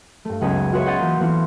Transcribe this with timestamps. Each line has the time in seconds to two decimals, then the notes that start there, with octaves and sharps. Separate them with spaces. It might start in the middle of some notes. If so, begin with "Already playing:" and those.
0.25 G2 A3
0.41 F#1 C#2 B3 D#4 G#5 B6
0.72 F4 F#4 G#4 B4 C#5 E5
0.86 C5 D#5 F#5 G6 A6
0.99 E3 A#3
1.20 E3 A3 B3 E4 F4 C5